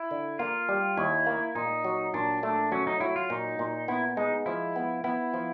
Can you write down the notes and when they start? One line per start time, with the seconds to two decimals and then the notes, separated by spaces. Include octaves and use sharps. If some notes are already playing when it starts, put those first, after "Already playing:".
Already playing: E4
0.11 D3
0.39 A#3 F4
0.69 G3
0.97 D#2 E4
1.26 A#3
1.55 A#2 D#4
1.84 F#3
2.14 A#2 D4
2.43 A3 D4
2.72 F#3 C#4
2.87 D#4
3.00 F#3 E4
3.16 F4
3.30 A#2 D#4
3.59 A#2
3.88 B3 E4
4.17 G#3 D#4
4.46 F3 E4
4.76 B3
5.04 B3 E4
5.34 F3